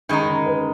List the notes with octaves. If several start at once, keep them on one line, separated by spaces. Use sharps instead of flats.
D#3 G#3 D#4 B5
B5
A#5
B4